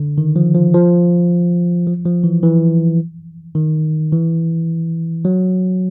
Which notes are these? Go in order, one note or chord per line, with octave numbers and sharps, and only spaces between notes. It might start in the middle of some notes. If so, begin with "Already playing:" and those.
Already playing: D3
D#3
F3
F3
F3
F3
F3
E3
E3
D#3
E3
F#3